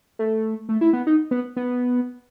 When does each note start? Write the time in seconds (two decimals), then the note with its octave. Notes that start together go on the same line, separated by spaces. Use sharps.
0.19 A3
0.69 A3
0.81 E4
0.93 B3
1.07 D#4
1.31 B3
1.57 B3